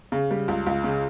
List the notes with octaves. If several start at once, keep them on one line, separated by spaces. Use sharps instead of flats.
C#3
G3
C#2
C#2
C#3